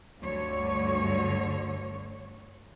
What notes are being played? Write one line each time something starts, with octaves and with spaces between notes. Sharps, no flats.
D2 G2 D3 C#5